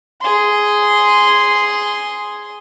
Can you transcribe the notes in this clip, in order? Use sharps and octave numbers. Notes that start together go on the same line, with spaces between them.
G#4 C6